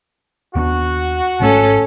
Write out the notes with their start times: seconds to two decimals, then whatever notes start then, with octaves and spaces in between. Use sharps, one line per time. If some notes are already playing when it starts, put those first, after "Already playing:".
0.55 D#2 B3 D4 F#4
1.40 G#1 G#2 A3 C#4 A4